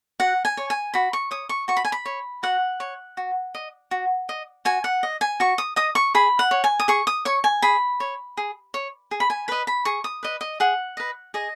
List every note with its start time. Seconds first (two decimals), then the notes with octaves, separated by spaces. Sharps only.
0.20 F#4 F#5
0.45 G#5
0.57 C#5
0.70 G#5
0.94 F#4 B5
1.13 C#6
1.31 C#5 D#6
1.49 C#6
1.68 F#4 C#6
1.77 B5
1.85 G#5
1.92 B5
2.06 C#5
2.43 F#4 F#5
2.80 C#5
3.17 F#4
3.55 D#5
3.91 F#4
4.29 D#5
4.65 F#4 G#5
4.84 F#5
5.03 D#5
5.21 G#5
5.40 F#4 C#6
5.58 D#6
5.76 D#5 D#6
5.95 C#6
6.15 G#4 B5
6.39 F#5
6.51 C#5
6.64 G#5
6.80 D#6
6.88 G#4 C#6
7.07 D#6
7.25 C#5 C#6
7.44 G#5
7.62 G#4 B5
8.00 C#5
8.37 G#4
8.74 C#5
9.11 G#4
9.20 B5
9.30 G#5
9.48 B4 D#5 B5
9.67 B5
9.85 G#4 C#6
10.04 D#6
10.23 B4 D#5
10.41 D#5
10.60 G#4 F#5
10.97 B4 D#5
11.34 G#4 D#5